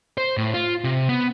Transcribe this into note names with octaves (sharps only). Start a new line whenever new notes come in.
C5
A2
F4
C3
B3